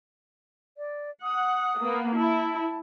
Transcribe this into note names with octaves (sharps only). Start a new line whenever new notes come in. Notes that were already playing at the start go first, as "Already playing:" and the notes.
D5
F#5 D#6
A#3 B3
E4 A5